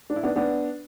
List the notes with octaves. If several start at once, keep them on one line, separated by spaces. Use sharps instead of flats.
D4
E4
B3 D4
B3 D4